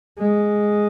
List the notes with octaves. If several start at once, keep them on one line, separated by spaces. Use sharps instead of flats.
G#3